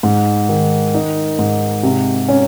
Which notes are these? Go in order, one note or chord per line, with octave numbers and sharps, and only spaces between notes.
G#2
D#3
D#4
G#2
C3
C#4